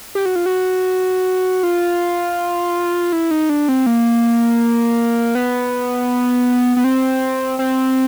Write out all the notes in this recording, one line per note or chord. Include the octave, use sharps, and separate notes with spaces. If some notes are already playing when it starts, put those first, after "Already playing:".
G4
F#4
F4
F#4
F4
E4
D#4
D4
C4
A#3
B3
B3
C4
C4